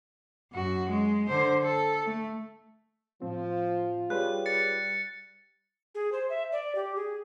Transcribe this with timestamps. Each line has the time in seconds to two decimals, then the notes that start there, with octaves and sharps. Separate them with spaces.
0.52 F#2 F#4
0.89 G#3
1.29 D3 C5
1.63 A4
2.06 A3
3.22 A2 F3 C4 F4
4.10 G3 G#4 B4 C#5 F#6
4.46 A6 C#7
5.95 G#4
6.12 C5
6.30 E5
6.52 D5
6.75 G4
6.96 G#4